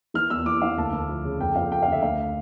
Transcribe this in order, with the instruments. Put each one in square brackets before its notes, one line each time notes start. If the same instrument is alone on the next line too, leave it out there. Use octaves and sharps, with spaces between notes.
[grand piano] E3 F6
E2 E6
E2 D6
E3 F5
D2 A5
D2
F3
C#3
F2 G5
F2 F5
F3 G5
F5
D3 E5
D2 F5